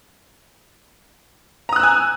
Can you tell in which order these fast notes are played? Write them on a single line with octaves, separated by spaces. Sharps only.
A#5 D#6 F#6 E6 G#5